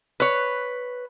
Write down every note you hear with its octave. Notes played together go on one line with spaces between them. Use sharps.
B4 C#5